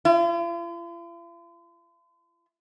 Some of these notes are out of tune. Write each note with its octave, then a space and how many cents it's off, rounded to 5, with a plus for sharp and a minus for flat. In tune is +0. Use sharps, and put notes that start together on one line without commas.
F4 -45